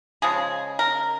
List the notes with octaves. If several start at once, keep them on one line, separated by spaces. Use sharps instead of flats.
C#3 F3 G#3 G#4
A#4